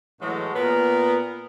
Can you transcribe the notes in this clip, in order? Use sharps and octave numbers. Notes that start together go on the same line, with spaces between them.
A2 E3 F#3 G#3 A3 F#4
A#2 B3 A#4